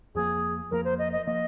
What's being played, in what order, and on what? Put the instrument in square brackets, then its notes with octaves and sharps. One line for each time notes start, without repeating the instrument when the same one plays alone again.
[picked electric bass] F2 F3 A#3 [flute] G#4
[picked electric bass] F2 F3 A#3 [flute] A#4
[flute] C5
D#5
D#5
[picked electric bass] F3 A#3 [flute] D#5